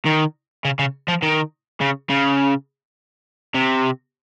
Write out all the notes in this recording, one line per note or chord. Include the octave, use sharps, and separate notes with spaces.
D#3
C#3
C#3
F3
D#3
C#3
C#3
C3